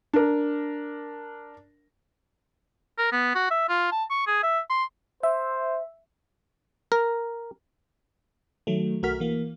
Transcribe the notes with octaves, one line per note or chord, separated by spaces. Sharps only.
D4 A#4
A#4
B3
F#4
E5
F4
A5
C#6
G#4
E5
C6
C5 E5
A#4
D#3 F#3 A3
B1 A3 F#4 A#4 F6 B6
E3 A#3